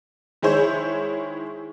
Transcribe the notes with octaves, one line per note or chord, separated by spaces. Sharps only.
D#3 G#3 E4 G#4 C5 C#5